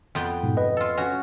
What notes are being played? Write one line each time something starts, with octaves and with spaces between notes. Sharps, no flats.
F2 B3 G5
G#2 B2
B4 D#5
F4 A4
C#4 F#4